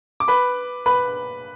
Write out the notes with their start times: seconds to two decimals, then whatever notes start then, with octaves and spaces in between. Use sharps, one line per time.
0.20 D6
0.28 B4 B5
0.86 B4 B5